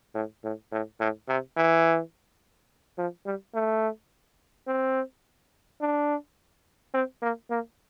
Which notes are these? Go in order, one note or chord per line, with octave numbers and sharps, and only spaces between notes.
A2
A2
A2
A2
C3
E3
F3
G3
A3
C4
D4
C4
A#3
A#3